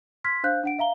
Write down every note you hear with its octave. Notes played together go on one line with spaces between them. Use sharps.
C6 F6 G#6 B6
D4 C5 F5 F#6 G6
D4 F#5 D7
E5 F5 A#5 G7